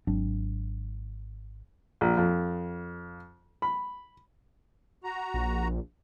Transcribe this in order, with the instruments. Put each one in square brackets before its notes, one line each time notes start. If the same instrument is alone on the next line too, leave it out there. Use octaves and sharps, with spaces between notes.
[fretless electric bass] G#1 F#3 C4 D4
[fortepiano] A#1
F2
B5
[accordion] F#4 A#5
[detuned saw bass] A#1